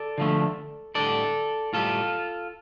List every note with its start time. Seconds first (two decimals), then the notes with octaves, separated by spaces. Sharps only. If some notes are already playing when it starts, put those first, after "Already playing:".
Already playing: A4 D5
0.18 D3 F3 A3
0.95 A2 G3 A4 D5
1.73 A2 G3 F4 A4